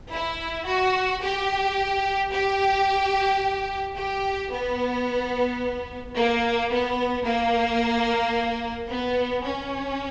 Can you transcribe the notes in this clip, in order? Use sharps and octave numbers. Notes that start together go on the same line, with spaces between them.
E4
F#4
G4
G4
G4
B3
A#3
B3
A#3
B3
C#4